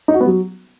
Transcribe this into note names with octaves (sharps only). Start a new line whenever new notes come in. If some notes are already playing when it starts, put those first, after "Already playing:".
D#4
F#4
B3
F#3